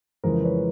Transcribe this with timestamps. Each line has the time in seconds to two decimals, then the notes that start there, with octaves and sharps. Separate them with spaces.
0.24 F2 C#3 E3 G#3 A#4 C5
0.44 B4 C#5